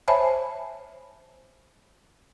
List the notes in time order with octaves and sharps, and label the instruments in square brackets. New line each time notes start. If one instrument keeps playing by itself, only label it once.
[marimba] C5 C#5 E5 G#5 A5 B5